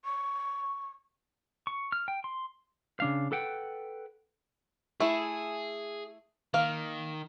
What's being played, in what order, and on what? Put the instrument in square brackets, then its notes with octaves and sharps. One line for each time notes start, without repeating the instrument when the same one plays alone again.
[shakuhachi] C#6
[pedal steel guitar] C#6
F6
G5
C6
[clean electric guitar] C#3 D4 F5
A4 B4 F#5 G5
[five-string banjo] A3 E4 [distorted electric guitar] G#4
[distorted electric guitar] D#3 [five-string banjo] A#3 F5